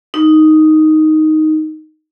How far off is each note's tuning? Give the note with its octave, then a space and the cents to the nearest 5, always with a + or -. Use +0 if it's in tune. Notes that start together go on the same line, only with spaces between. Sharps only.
D#4 +0